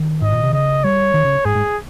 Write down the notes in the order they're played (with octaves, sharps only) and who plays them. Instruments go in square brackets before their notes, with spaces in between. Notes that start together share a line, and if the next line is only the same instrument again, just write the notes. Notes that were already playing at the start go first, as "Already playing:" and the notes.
Already playing: [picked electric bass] D#3
[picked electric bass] G#2 [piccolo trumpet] D#5
[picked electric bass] A#2
C3
[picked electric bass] C#3 [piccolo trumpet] D#5
[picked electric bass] G3 [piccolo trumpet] C#5
[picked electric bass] D#3
C#3
[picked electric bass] G#2 [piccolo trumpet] G#4
[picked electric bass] G#2